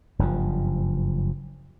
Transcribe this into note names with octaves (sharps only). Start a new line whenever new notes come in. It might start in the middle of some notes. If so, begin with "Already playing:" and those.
F#1 G2 A#2 F3